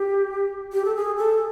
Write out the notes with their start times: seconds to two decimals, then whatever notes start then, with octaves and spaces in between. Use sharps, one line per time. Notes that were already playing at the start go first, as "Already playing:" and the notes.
Already playing: G4
0.73 G4
0.85 A4
0.96 G#4
1.17 A4